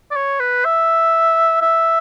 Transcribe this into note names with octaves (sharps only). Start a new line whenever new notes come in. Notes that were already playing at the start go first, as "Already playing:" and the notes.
D5
C#5
B4
E5
E5